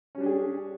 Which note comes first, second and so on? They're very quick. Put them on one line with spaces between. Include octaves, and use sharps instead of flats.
C#4 G3 D4 G4 G#4